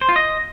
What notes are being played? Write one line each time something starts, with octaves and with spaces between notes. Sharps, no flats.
C5
F4
D#5